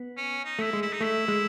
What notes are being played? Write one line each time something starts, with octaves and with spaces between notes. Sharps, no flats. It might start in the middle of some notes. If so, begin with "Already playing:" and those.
Already playing: B3
C#4
D#4
A3 E4
G#3
E4
D#4
A3 E4
G#3